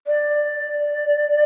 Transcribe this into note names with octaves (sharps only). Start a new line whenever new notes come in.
D5